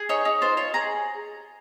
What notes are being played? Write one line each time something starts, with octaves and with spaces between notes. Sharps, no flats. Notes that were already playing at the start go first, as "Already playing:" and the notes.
Already playing: G#4
D#4 C#5
D#4
F4 C5
F4 C#5
G#4 A#5